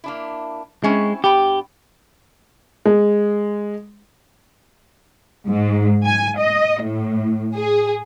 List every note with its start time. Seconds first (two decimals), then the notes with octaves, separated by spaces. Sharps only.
0.04 A#3 D4 E4
0.84 G#3 C4 C#4 E4
1.24 G2 B3 G4 G5
2.86 G#3
5.48 G#2
6.06 G#5
6.39 D#5
6.83 A2
7.56 G#4